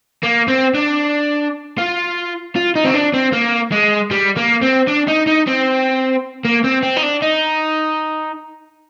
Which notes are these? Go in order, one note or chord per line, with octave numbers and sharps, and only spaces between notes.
A#3
C4
D4
F4
F4
D#4
C4
D4
C4
A#3
G#3
G3
A#3
C4
D4
D#4
D#4
C4
A#3
C4
C4
D#4
D4
D#4